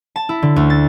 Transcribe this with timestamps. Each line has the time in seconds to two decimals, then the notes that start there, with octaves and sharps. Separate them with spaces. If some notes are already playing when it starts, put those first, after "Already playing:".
0.16 A5
0.29 E4
0.42 D3
0.56 D2
0.70 A6